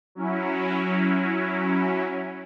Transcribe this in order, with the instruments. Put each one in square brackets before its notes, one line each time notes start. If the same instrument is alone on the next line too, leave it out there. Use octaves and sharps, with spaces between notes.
[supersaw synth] F#3 C#4 E4